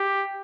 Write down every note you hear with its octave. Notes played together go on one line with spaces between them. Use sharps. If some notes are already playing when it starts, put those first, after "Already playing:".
Already playing: G4